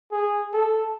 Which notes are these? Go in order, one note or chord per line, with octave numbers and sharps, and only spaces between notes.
G#4
A4